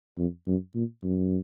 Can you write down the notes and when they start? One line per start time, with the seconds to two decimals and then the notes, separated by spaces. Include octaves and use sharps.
0.18 F2
0.47 F#2
0.75 A#2
1.03 F#2